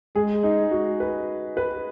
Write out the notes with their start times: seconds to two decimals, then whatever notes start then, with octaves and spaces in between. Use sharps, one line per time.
0.15 G#3 G#4
0.43 D#4
0.71 F#4
1.00 B4
1.57 B4